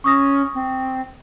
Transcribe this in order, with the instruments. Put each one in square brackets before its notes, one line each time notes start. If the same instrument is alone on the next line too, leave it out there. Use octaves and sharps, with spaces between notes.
[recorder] C#4 [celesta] C#6 D#6 A#6
[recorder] C4